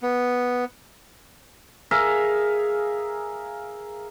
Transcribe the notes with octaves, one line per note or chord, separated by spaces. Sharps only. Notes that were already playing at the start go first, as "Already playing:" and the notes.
B3
G#4 A#4 E5 F5